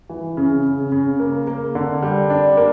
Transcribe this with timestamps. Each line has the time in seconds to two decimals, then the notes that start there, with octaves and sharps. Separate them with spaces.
0.10 E3
0.37 C#3
0.65 C#3
0.92 C#3
1.20 A#3
1.47 A#3
1.75 D3
2.02 G3
2.30 D4
2.57 A#3